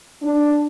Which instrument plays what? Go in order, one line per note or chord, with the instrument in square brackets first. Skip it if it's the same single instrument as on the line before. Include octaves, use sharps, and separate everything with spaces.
[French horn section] D4